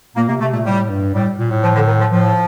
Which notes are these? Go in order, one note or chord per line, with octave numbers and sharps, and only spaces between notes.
A#2 A#3
C3 A#3
C3 A3
A#2 A3
A2 G3
G2
A2 G3
A#2
A2
F3
D3
D#3
F3
A2 F3